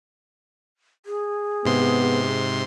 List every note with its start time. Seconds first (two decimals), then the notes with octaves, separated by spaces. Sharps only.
1.06 G#4
1.65 G#2 C3 B3 C6